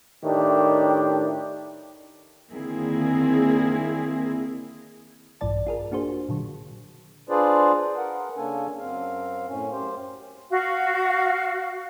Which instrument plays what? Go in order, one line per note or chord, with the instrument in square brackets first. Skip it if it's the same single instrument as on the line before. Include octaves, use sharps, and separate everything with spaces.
[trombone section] A2 D#3 D4 G4
[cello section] D3 D#3 A#3 C4 E4 G#4
[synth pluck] A#1 G2 E3 D5 A5
F4 G#4 A#4
A#3 D4 F#4 G#4 C5
A#2 D3 F#3
[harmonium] D4 F4 G#4 B4 C5 D5
A#4 F#5
C#3 A#3 C#4 D4 A4 G#5
F#2 C4 F5
A2 C#4
F#2 G4 C5
[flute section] F#4 F5